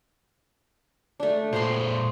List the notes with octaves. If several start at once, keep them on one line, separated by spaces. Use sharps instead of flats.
A3 D4
A#2 A4 C5 A#5 C6